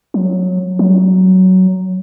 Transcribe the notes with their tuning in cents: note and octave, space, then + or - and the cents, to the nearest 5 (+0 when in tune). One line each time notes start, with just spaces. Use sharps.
F#3 -15
F#3 +10